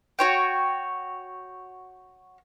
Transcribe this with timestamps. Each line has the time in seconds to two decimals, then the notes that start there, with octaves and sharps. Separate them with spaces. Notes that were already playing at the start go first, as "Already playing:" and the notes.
0.19 F#4 C#5 G5